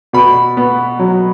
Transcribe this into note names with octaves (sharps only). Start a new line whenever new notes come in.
B2 B5
B3
F#3